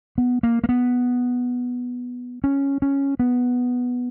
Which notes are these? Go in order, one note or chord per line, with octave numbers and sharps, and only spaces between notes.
B3
A#3
A#3
B3
C#4
C#4
B3